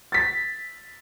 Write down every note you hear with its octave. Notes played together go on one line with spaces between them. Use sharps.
A6 B6